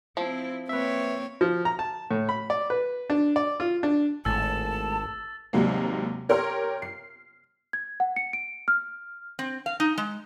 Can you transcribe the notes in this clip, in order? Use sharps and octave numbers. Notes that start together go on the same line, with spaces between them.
F3 C4 E4
A#3 C4 B4 C#5 E5
F3
A#5
A5
A2
B5
D5
B4
D4
D5
F4
D4
G#1 A2 G#3 G#5 A5 E6 A6
D#2 G#2 C3 F#3 G3 A#3
G4 A#4 C#5 G5 C6 F6
C7
G#6
F#5
C#7
D7
F6
C4
F5
D#4
G#3